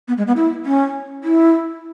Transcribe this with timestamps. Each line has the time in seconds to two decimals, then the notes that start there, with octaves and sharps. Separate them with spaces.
0.08 B3
0.17 G#3
0.27 B3
0.36 E4
0.65 C#4
1.24 E4